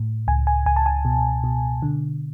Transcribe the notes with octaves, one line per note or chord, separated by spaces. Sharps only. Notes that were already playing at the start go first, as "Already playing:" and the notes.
Already playing: A2
C#2 G#5
G#5
C#2 G#5
A5
G#5
B2
B2
D3